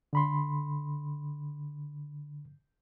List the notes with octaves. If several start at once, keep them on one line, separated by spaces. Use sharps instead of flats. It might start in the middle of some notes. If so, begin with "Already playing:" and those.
D3 B5 C6